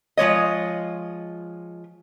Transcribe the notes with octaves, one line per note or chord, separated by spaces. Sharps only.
F3 G#3 C#5 D#5